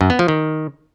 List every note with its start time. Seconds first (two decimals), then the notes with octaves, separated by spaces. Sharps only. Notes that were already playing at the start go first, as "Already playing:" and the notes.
0.01 F#2
0.10 B3
0.19 F3
0.28 D#3